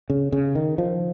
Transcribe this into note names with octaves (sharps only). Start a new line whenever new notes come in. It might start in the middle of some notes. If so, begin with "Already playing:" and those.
C#3
C#3
D#3
F3